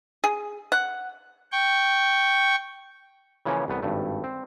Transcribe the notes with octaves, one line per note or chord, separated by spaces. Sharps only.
G#4
F#5
G5 C#6
C#3 E3 F3 A#3 C#4
C2 A3 B3
G#1 G2 A3
C4